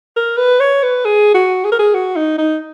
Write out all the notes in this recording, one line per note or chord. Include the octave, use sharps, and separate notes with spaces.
A#4
B4
C#5
B4
G#4
F#4
G#4
A#4
G#4
F#4
D#4
D#4